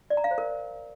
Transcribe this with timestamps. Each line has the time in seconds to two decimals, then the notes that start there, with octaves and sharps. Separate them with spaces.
0.10 D5
0.17 A#5
0.24 F5
0.31 C5
0.38 A#4